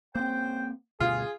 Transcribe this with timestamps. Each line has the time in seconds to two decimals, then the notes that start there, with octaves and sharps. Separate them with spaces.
0.15 C#3 A#3 C4 C5 G5
1.00 D2 G2 B2 F4 G#4